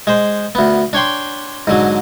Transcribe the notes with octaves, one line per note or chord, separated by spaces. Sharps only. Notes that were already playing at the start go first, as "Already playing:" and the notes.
G#3 C5
D2 B3
D4 C#5 G5 C6
G#2 D3 F#3